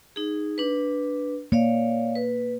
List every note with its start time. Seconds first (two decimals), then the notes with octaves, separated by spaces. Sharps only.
0.16 D#4 G#4
0.58 D4 B4
1.52 A#3 C#5 D5 F5
2.15 B4